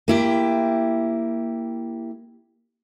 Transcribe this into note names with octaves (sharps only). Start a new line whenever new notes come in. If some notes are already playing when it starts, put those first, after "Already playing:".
A#3 E4 G4